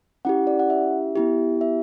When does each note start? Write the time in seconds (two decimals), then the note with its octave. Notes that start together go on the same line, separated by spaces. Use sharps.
0.25 C#4 E4 G4 F#5
0.47 D5
0.59 F#5
0.70 E5
1.16 B3 E4 G4
1.61 E5